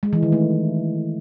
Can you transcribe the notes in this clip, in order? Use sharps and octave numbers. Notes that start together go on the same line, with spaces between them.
G#3
E3
D#3
A3